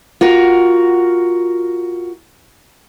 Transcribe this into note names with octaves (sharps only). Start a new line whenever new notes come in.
F4 F#4 A#4